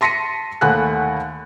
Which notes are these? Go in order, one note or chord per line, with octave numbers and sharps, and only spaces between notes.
A5 C6 A#6 B6 C#7 D#7
D#2 A3 F#5 G#5 B5 F#6